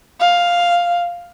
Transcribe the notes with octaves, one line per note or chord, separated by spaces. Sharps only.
F5